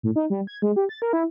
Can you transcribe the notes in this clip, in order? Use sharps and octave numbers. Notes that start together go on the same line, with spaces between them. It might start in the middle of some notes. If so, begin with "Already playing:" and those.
A2
D#4
G3
G#6
G#3
G4
A6
A#4
E4